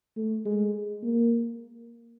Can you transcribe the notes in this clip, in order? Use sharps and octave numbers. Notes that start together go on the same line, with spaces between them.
A3
G#3
A#3